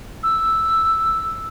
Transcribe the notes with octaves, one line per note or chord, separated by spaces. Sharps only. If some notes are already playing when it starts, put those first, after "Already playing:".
E6